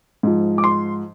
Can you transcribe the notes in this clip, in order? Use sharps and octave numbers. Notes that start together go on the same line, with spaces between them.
G#2 F3
D6
C6